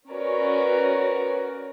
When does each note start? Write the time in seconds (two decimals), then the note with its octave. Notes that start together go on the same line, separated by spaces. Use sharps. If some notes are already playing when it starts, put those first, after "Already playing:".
0.11 C#4 F#4 A#4 B4 C#5 D5